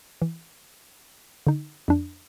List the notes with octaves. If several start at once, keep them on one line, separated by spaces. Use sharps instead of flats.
E3
D3 D#4
F2 D4